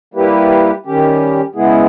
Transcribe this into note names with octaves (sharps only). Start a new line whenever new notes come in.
G3 A#3 E4 G4 B4
D#3 G3 C#4 G4
C#3 G#3 B3 E4 G#4